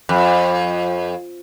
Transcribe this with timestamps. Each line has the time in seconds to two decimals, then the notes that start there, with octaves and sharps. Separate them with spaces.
0.09 F2